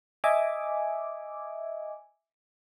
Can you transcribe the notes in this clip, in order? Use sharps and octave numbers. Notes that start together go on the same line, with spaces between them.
D#5 E5 G#5 D6